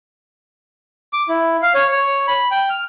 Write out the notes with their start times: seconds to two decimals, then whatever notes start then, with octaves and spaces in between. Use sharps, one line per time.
1.13 D6
1.29 E4
1.62 F5
1.75 C#5
1.92 C#5
2.28 B5
2.51 G5
2.70 F6